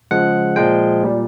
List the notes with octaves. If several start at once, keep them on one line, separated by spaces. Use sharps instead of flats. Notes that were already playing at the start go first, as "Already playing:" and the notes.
C#3 F3 G#3 F#5
A#2 F3 G#3 G5
A#2 G3